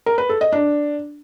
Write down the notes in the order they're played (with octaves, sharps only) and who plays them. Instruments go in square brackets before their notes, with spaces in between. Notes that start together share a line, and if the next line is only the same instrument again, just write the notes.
[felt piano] A#4
B4
A4
D#5
D4